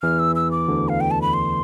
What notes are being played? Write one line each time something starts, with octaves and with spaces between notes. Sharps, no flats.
E2 E3 F6
E6
E6
D6
D2 D3
F5
G5
A5
B5
C6